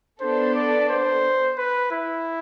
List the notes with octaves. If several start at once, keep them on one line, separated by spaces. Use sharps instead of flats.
B3 D4 A4 C5
D5
C5
B4
E4